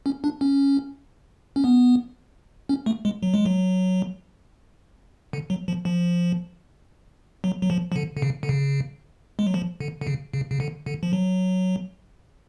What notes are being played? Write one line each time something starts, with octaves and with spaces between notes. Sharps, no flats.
C#4
D4
C#4
C#4
B3
C#4
A3
G#3
F#3
G#3
F#3
D3
F#3
F3
F3
F#3
F#3
F3
F3
D3
D3
C#3
D3
C#3
G#3
F#3
F3
D3
D3
C#3
C#3
C#3
D3
D3
F3
F#3